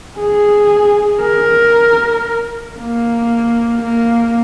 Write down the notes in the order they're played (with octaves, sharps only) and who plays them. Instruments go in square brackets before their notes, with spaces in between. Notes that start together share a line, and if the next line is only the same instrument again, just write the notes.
[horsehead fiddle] G#4
A#4
A#3
A#3